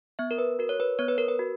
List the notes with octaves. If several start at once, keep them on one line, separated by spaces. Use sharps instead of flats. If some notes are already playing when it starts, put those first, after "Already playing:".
B3 E5
A#4
B4
F#4 A#4
C#5
B4
B3 C#5
B4
A#4
B4
F#4